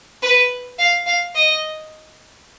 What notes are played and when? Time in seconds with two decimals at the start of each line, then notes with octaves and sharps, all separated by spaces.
0.22 B4
0.78 F5
1.06 F5
1.35 D#5